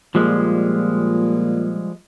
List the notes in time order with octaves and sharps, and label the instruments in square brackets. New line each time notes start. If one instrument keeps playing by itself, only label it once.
[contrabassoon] A#2 [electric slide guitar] F3 G3 G#3